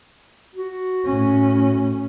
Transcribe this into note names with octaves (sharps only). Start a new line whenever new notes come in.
F#4
A2 C#4